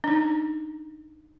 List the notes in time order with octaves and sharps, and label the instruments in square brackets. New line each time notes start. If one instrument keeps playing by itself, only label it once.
[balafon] D4 D#4